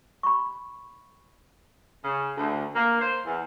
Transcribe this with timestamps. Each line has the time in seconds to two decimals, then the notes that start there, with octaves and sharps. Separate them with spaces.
0.23 B5 C#6
2.04 C#3
2.37 D2
2.75 A#3
3.00 C5
3.25 E2